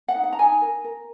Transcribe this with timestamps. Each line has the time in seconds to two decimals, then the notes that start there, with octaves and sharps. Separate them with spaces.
0.08 F#5
0.15 D#4
0.23 F#5
0.33 A#5
0.39 D#4 G#5
0.61 A#4
0.84 A#4